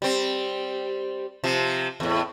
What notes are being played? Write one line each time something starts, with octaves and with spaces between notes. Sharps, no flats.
G3 C4
C3 F3
E2 A2